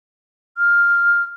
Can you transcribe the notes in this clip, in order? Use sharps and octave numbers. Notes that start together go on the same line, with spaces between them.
F6